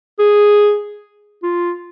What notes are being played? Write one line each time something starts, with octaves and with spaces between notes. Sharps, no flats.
G#4
F4